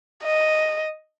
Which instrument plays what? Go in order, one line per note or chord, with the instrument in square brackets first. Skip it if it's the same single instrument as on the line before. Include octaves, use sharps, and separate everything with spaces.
[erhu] D#5